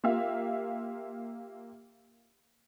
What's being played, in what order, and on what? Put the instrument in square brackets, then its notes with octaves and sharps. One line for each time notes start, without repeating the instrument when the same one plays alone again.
[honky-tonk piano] A#3 F4 G4 E5 F5